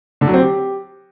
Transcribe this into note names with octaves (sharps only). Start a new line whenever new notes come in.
D3
F#3
C4
G4